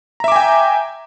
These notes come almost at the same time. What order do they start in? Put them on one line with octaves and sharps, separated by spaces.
A#5 E5 D6 G#5 G5